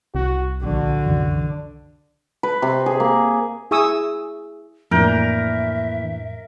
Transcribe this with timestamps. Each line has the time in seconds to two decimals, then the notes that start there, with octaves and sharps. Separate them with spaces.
0.15 C2 F#4
0.63 A#1 D3 F3 F#4
1.06 F#2 C3 E3
2.43 B4
2.62 C3
2.86 G#4
3.00 A#3
3.71 E4 G#4 G#5 C#6 D#6 E6
4.91 F2 A2 E3 A#3 D4 A#4 E5 G6